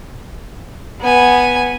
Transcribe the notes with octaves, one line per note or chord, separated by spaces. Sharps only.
B3 G#5